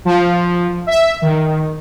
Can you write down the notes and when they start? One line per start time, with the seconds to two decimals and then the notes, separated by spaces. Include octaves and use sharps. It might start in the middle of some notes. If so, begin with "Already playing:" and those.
0.05 F3
0.87 E5
1.22 D#3